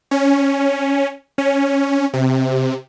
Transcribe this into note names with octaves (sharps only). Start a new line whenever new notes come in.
C#4
C#4
C3